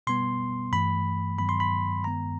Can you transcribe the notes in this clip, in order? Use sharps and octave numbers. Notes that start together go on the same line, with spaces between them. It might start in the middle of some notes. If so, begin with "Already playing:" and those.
B2 G3 B3 C6
G2 E3 A3 B5
G2 D#3 F#3 B3 B5
C6
B5
G2 D#3 G#3 B3 A#5